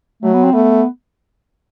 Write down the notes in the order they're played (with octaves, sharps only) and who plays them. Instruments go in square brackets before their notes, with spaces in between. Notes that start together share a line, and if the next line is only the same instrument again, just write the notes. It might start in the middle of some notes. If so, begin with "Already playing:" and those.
[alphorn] F#3 [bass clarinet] A3
[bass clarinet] B3
C4
[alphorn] A3 [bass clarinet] B3